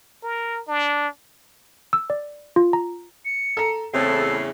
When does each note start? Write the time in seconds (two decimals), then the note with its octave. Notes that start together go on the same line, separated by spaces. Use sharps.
0.23 A#4
0.68 D4
1.93 E6
2.10 D5
2.56 F4
2.73 A#5
3.25 C#7
3.57 A4 A#5
3.94 E2 A2 C#3 C4 A4 C7